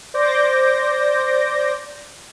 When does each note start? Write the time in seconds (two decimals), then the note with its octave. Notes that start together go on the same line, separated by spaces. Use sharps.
0.14 C5 D5 D6 G6 A#6